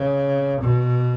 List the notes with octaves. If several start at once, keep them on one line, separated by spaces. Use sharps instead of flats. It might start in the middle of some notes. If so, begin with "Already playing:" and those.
Already playing: C#3
B2